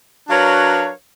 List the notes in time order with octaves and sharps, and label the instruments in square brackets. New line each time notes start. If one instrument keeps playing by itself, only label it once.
[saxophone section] F#3 D4 A#4 B4 C#5 F5